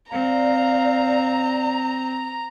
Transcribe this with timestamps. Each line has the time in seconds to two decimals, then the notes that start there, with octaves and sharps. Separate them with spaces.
0.12 C4 D5 F5 A#5